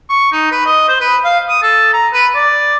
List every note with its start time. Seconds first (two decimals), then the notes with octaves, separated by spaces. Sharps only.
0.09 C#6
0.32 D#4
0.51 B4
0.66 D#5
0.88 C5
1.00 B4
1.24 F5
1.49 D#6
1.62 A4
1.93 A#5
2.13 B4
2.35 D5